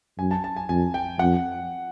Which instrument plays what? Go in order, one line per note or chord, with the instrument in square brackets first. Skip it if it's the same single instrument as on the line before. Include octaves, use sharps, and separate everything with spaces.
[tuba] F#2 [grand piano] G#5
[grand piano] A5
A5
G#5
[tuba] F2 [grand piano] G#5
[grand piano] G5
[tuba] F2 [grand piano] F#5